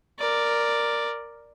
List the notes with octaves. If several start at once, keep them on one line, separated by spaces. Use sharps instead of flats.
A#4 D5